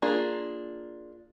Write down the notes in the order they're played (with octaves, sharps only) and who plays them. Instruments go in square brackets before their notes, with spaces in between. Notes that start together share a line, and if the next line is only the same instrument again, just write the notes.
[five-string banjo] A#3 D4 F4 G#4